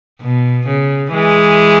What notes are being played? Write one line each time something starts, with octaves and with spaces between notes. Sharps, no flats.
B2
C#3
E3 G#3